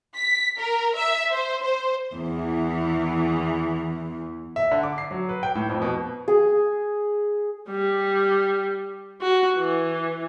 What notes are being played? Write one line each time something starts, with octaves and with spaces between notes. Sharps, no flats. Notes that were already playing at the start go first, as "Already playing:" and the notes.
B6
A#4
E5
C5
C5
E2 E3
E5
D3
D6
C7
F#3
B4
G5
A2
F2
B2
G#4
G3
F#4
E3